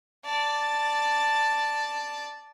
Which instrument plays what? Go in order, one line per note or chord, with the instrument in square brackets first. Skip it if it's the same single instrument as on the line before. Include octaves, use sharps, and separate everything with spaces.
[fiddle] D5 A5